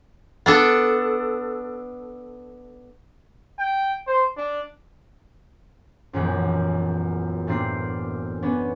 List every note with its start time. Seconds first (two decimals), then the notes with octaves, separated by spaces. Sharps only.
0.46 B3 D4 A4
3.59 G5
4.07 C5
4.37 D4
6.13 E1 A#1 F#2
7.47 A2 A3 A#3 C4 D4 C7
8.42 B3 C#4 D4